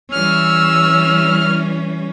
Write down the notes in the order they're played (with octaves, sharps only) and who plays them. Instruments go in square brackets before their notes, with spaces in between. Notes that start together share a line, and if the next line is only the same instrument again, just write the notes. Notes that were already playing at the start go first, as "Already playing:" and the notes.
[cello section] E3 G3 C#4 [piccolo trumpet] E6 [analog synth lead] F6